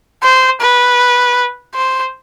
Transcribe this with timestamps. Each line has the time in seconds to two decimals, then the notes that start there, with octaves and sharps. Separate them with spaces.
0.23 C5
0.61 B4
1.75 C5